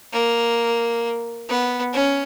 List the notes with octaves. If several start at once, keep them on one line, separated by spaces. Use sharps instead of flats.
A#3
B3
C#4